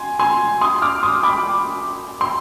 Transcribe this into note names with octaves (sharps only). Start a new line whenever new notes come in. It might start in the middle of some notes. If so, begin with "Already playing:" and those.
Already playing: G#5 C6
G#5 C6
C6 D#6
D6 F6
C6 D#6
B5 D6
C6